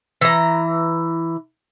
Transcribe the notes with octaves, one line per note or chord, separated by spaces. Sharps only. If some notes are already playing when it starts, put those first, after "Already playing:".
E3 A#5